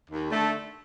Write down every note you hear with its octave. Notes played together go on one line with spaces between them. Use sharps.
D#2
D3 A3